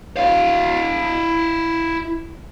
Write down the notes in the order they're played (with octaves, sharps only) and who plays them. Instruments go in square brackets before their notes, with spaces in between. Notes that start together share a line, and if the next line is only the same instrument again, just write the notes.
[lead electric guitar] E4 F5